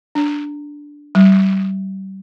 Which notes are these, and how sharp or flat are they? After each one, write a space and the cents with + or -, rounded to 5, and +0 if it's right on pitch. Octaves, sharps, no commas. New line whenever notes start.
D4 -5
G3 -30